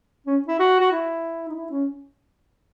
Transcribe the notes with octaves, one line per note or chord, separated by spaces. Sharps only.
C#4
E4
F#4
F#4
E4
D#4
E4
C#4